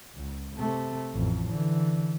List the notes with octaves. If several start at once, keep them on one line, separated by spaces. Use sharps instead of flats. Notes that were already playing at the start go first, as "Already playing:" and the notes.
C#2
C3 A3
A1 F2
D3 E3